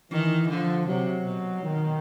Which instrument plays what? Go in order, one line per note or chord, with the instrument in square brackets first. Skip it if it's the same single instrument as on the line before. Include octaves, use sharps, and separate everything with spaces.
[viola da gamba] D#3 [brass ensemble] E3
[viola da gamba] D3 [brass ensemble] F3
[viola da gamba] C3 [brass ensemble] F#3
[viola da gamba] B2
[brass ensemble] D#3